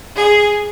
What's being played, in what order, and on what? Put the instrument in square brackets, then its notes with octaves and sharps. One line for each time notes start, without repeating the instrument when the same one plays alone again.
[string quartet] G#4